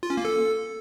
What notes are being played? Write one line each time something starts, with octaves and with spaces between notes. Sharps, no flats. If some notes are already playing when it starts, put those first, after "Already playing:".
F4
C#4
A#3
A4